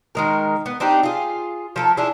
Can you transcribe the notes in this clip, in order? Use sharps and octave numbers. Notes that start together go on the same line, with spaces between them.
D#3 G#3 A#4
B3
C4 D4 D#4 G4
F4 G#4
F3 A4 A#4
D4 E4 F4 G#4